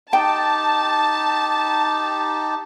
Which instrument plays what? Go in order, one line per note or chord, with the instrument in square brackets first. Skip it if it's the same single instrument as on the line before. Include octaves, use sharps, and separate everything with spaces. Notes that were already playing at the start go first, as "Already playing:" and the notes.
[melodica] D#4 G4 [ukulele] G5 [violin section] A5